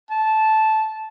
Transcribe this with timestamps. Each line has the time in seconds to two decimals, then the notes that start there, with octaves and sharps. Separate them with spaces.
0.10 A5